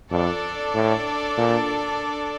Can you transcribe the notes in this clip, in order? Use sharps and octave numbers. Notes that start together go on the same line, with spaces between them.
F2 D4 A4 D5
A2
A#2